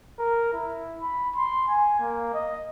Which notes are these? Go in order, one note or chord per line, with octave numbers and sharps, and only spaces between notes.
A#4
E4
B5
C6
G#5
A#3
D#5